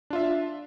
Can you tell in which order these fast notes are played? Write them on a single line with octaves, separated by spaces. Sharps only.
D4 F4 E5